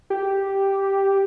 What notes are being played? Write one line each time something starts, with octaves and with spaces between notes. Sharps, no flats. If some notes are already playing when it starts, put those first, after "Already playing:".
G4